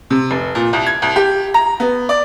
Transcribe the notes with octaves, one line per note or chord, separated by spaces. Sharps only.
C3
F1
A#2
C2
G#6
C2
G4
A#5
B3
D5